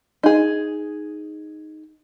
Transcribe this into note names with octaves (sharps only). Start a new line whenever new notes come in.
D#4 G#4